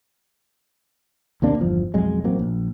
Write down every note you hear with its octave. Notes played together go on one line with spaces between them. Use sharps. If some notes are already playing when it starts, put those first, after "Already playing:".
D#2 C3 A#3 D4
G1 E2 F3
B1 F2 F#3 G#3
A1 F#3 A#3 C4
A#1